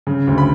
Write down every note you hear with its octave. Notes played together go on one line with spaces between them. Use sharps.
C#3
D2
B5